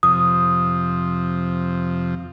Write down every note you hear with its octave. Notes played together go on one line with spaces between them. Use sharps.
F2 C3 F3 D#6